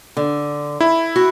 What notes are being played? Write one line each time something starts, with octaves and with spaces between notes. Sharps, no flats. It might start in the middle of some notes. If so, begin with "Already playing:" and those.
D3
E4
F#4